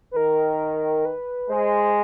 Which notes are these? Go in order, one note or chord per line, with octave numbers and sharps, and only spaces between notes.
B4
D#3 A#4
B4
G#3 C5